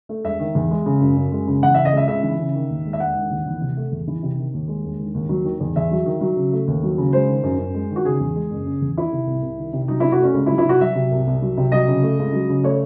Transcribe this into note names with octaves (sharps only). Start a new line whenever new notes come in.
A3
E1 E5
D#3
E2
G#3
C#3
F#2
F#2
G#3
C#3
E3 F#5
C#3 E5
D#5
C#2 E5
C#2 E5
E3
C#3
D#3
D#2
G#3
E5
E1 F#5
D#3
D#2
E3
C3
A3
E2
E3
C3
D#3
D#2
G#3
E1
D#3
D#2
F#3
D#3
E2
E2 E5
F#3
D#3
F#3
C#3
A3
D#2
F#3
C#3
G#3 C5
D#3
F#2
F#2
G#3
D#3
F#4
C#3 G#4
E2
G#3
F#1
C#3
E2
D#3 E4
C3
C2
C2
D#3
C3
F#3 D#4
C3 E4
F#4
A3
C#4
C#2
E4
F#3
E4
C3 F#4
F#3 E5
C3
C2
C2
F#3
C3
F#3 D#5
C#3
A3
C#2
F#3
C#3
A3 C#5